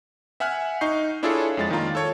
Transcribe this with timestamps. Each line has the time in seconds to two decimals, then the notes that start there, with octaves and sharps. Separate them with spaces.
0.40 E5 F#5 G#5 F6 F#6
0.81 D#4 C#6 G6 C7
1.23 D4 E4 F4 G#4 A4 C#5
1.57 F2 G#3 A6
1.71 D#3 A#3 F4 A#5
1.95 A4 C#5